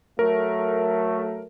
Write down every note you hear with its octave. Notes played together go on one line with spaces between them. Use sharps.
F#3 A3 A#4